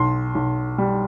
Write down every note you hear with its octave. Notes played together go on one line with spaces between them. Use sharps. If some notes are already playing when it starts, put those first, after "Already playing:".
Already playing: B1 C6
B1
G3